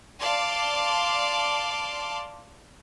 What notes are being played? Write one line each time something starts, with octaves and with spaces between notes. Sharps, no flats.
D5 F5 A5 C6 D6